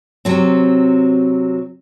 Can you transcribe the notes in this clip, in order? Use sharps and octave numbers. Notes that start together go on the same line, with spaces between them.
C3 F#3 C4